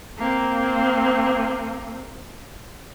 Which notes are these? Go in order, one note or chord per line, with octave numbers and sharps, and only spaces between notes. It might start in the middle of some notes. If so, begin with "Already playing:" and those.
A#3 C4